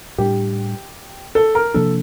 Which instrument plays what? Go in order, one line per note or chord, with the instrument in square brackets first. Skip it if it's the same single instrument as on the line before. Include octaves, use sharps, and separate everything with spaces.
[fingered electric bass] A2 G3 D4 [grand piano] G4
[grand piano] A4
A#4
[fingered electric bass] C3 F3 A#3 D4 [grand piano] A4